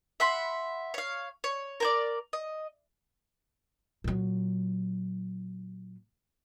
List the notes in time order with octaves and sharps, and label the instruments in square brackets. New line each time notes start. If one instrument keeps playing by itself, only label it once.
[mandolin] E5 F#5 B5 C6
C#5 F5
C#5
A#4 C5 D5
D#5
[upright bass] A#2 F#3